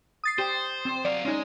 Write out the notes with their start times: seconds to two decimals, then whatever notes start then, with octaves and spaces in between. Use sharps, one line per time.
0.24 D#6 A6 C7
0.38 G4 C5
0.85 C4
1.05 F#3 D5 F5
1.25 G#3 C#4 D#4